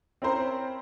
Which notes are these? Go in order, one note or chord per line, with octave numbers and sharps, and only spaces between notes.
C4 C#4 E4 A#4 C5